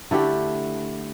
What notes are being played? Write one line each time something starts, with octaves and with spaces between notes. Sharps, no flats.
D3 A3 E4 G4